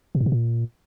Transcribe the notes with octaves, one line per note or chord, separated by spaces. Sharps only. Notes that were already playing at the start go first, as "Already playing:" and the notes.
B2
G#2
B2
A#2